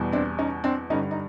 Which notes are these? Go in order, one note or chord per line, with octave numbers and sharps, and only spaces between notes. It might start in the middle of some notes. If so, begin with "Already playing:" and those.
Already playing: E2 B2 G3
C4 D4
C#4 D#4
C4 D4
G2 D3 G3 C#4 D#4
D#4